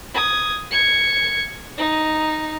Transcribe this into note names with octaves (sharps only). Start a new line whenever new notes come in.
D#6 G#6
G#6 C#7
D#4